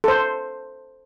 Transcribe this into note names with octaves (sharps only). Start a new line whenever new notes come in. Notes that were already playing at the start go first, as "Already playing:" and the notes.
A4 C5